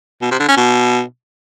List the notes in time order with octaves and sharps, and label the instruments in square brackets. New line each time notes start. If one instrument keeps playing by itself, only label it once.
[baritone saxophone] B2
C3
D3
C#4
B2